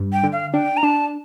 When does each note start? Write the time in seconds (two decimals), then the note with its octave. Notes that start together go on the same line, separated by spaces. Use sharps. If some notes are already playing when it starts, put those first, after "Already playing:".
Already playing: G2
0.13 G5
0.23 D3
0.33 F5
0.53 D4 G5
0.77 A#5
0.83 D4 A5